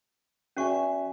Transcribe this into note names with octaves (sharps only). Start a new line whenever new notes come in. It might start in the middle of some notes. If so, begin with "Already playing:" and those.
E2 C#4 F#4 E5 G#5 C#6